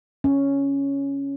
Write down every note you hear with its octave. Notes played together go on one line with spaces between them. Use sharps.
C#4